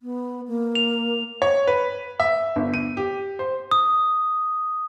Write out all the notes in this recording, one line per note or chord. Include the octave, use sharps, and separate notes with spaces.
B3
A#3
F7
C#5
B4
E5
G1
D#7
G4
C5
D#6